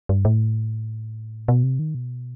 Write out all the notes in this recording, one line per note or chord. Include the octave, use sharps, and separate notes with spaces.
G2
A2
B2
C3
D#3
B2